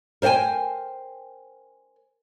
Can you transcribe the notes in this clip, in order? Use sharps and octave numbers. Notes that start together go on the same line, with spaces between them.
A#4 C5 D#5 G5 G#5